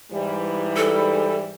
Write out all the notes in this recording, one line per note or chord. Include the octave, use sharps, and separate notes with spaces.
G#2 E3 G3
A4